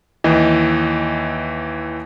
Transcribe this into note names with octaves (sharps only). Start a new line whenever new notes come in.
D#2 E3 D#5